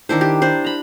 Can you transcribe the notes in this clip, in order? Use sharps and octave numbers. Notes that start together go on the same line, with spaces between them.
D#3 D4 E4 C5
G4
D4 C5
A#5 B5